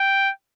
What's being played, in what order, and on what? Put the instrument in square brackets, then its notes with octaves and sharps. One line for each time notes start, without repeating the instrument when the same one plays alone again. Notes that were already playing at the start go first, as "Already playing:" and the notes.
Already playing: [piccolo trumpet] G5